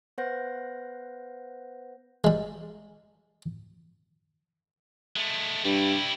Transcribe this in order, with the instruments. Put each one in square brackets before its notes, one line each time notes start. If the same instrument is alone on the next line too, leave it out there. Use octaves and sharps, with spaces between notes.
[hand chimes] B3 B4 C5 F#5 G6 A#6
[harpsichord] G3 G#3
[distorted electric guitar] G#3 A3
[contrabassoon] G2 [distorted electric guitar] G3 E4